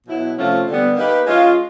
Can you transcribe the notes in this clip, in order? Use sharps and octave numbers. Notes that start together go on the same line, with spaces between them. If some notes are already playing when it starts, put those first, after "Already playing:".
B2 F#3 B3 E4
C3 F3 A3 C#4 F4
D3 G3 B3
A#3 D#4 G4 B4
G#3 C#4 F4